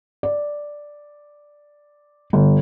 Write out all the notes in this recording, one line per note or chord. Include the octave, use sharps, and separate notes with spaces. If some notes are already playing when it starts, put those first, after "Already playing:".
D5
G1